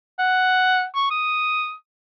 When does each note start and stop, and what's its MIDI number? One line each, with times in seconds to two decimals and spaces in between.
0.19 0.85 78
0.95 1.09 85
1.11 1.74 87